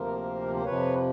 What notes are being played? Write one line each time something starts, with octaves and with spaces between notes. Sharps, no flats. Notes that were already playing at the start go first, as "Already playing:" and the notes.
Already playing: D2 C3 F3 A#3 A#4 C5
C5
F2 C3 F3 B4 C#5